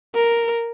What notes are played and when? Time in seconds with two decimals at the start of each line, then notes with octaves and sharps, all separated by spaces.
0.15 A#4